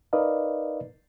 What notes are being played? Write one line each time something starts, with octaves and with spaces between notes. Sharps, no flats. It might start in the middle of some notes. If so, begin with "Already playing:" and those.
D#4 A#4 B4 D5 D#5 F5